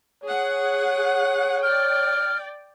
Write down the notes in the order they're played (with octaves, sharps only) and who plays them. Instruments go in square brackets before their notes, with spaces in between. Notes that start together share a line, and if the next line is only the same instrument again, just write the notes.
[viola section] G#4 F#5 [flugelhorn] C#5
[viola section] D5 G5 [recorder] F6